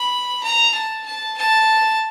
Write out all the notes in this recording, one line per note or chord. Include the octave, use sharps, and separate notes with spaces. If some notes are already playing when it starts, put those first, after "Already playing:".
Already playing: B5
A#5
A5
A5
A5